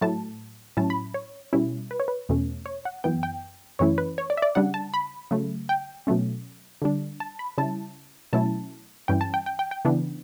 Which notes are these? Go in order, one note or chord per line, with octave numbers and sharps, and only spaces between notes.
A2 F#3 A3 A5
A2 F#3 C#4 E4 A5
B5
C#5
B2 G3 C#4 E4
B4
C#5
B4
E2 B2 A3 C#4
C#5
F#5
F#2 E3 B3 G5
G5
F#2 E3 A3 C#4 E4 C#5
B4
C#5
D5
E5
D5
C#3 G3 D4 F#5
A5
B5
C#3 F#3 A3
G5
B2 F#3 A3 C#4
D3 G3 D4
A5
B5
C#3 G3 C#4 E4 A5
B2 F#3 A3 C#4 E4 A5
G2 E3 G3 C#4 G5
A5
G5
G5
G5
G5
C#3 E3 B3 D4